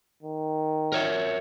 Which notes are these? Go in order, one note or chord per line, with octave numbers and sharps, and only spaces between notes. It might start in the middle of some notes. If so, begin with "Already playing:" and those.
D#3
A#4 C#5 E5